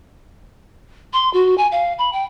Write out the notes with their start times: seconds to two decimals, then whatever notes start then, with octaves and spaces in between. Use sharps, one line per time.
1.13 C6
1.33 F#4
1.58 G#5
1.72 F5
1.98 B5
2.13 G5